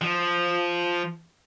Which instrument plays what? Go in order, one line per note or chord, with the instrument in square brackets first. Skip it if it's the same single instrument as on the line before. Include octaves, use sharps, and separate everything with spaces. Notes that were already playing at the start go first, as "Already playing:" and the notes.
[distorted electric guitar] F3